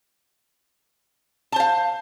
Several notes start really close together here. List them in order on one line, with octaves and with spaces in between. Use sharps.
A5 C5 F5